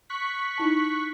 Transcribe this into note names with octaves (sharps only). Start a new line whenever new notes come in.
C#6 F#6 B6
D#4 E4 A5